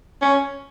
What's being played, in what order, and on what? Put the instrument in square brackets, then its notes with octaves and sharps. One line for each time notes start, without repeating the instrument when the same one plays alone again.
[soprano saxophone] C#4